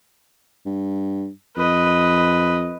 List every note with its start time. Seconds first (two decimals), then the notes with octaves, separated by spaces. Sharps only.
0.66 G2
1.57 F2 B4 D#5